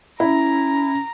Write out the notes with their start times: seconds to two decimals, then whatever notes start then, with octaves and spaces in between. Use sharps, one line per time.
0.20 C#4 E4 A#5